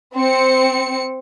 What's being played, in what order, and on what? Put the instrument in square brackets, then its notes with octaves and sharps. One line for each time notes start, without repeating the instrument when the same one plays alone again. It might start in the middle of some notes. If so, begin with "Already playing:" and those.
[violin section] C4 C#7